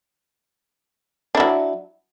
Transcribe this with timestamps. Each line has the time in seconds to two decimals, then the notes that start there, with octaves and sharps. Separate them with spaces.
1.35 D4
1.37 E4
1.40 F#3